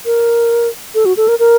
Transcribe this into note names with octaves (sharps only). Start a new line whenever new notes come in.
A#4
A4
F#4
A4
A#4
A#4